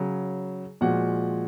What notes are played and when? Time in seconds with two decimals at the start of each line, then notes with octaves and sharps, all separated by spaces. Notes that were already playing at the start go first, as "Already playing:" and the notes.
Already playing: C#3 F#3
0.81 A#2 F3 G#3 F#4 F#5